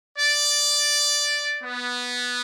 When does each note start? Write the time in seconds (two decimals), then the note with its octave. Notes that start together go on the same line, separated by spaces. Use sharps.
0.17 D5
1.62 B3